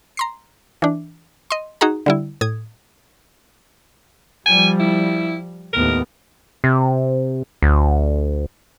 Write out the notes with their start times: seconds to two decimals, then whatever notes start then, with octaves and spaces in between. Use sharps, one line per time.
0.17 A#5 C6 C7
0.82 E3 D4
1.50 D#5 C6
1.81 D#4 F#4 G#4 A#5
2.06 D3 G3 E4
2.41 A2 D#6 G#6
4.46 F3 G3 G#5
4.80 E4
5.73 D#2 A2 B3 A#4
6.64 C3
7.62 D2